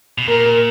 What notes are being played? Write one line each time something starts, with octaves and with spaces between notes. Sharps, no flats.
B2
A#2 A#4